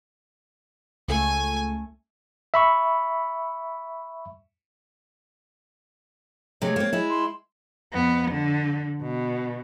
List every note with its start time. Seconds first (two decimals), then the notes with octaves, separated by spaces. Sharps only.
1.08 C#2 A3 G#5
2.54 E5 B5 C#6
6.62 C3 G#3 A3 C#5
6.76 A#3 C4
6.93 G#3 E4
7.10 C6
7.93 F2 B3
8.31 D3
9.02 B2